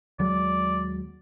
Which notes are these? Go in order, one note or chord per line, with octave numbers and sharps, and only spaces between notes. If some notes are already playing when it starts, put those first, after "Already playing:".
D#2 F#3 G#3 D5